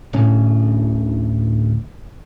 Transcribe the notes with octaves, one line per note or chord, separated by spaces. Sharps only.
D1 D2 A2 C#4